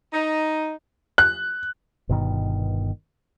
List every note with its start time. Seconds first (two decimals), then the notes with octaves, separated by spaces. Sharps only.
0.13 D#4
1.18 F#6
2.09 G1 G2 B2 D#3